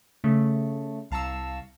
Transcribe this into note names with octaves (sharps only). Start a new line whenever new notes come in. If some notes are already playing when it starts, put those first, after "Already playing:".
C#3 A3
C2 F5 A5 A#5 C#6 E6